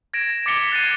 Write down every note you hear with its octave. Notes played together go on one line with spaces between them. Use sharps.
G#6 A#6 D7 E7
D6 A6 B6 C#7 F7 G7
F#6 G#6 A6 C7 C#7 D#7